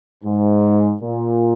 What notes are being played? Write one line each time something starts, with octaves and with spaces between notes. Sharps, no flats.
G#2
A#2